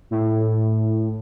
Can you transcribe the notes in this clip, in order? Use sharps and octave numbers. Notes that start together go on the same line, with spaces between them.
A2